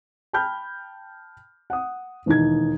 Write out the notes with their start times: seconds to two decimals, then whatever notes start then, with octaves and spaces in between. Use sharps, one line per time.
0.33 G5 A5 B5 F6 G6
1.70 F#5 D#6
2.26 E1 D#2 E3 D#4 G#6